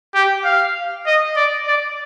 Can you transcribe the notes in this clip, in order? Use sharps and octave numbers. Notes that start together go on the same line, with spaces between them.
G4
F5
D#5
D5
D5